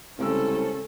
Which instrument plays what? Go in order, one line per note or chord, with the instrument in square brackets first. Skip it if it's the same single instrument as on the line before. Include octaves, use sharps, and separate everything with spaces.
[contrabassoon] C2 [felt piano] C#3 G#3 E6 [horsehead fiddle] C#4 A4